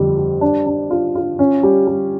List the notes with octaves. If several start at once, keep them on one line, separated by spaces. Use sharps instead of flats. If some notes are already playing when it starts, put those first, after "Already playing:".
Already playing: F2 D3 G3
G3
D4
D4
F4
F4
C#4
G3
G3